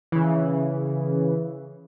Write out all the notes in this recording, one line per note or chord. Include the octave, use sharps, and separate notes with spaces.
C#3 E3